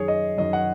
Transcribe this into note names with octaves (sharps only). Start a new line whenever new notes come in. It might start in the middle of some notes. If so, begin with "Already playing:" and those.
Already playing: F#2 D#3 G#4 C#5
D#5
F#2 D#3 D#5
F#5